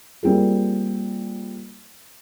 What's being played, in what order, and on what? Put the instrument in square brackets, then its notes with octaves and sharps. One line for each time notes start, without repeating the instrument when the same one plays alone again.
[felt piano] G3 A#3 C4 F4 G#4